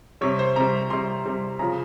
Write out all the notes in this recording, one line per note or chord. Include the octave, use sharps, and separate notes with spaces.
C3 G3 C#5
C5
C3 G3 A#5
C3 G3 C6
C3 G3
C#3 F3 A#5